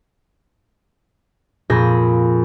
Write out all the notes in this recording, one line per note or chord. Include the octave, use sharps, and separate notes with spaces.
F2 A#2 G#4 C5 B5 A#6